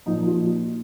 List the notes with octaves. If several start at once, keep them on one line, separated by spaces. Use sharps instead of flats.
A#2 F3 D#4
F4